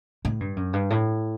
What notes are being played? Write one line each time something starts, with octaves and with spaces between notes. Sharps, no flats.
A2
G2
F#2
G2
A2